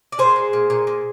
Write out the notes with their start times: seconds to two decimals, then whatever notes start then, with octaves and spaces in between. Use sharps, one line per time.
0.12 D5
0.18 A#2 G#4 C5
0.36 G#3
0.53 A#2
0.70 A#2
0.87 A#2